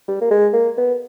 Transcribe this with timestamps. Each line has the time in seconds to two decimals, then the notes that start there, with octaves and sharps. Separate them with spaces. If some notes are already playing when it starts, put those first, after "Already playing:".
0.08 G3
0.21 A#3
0.31 G#3
0.53 A#3
0.78 B3